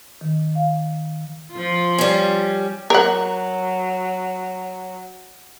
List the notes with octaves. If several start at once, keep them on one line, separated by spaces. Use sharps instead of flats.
D#3
F5
F3 F4
G3 C#4
F#3 A#4 F#5